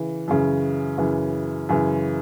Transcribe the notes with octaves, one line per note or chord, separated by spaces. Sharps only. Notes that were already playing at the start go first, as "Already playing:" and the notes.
Already playing: C#3 E3
F#2 C#3 E3
F#2 C#3 E3
F#2 C#3 E3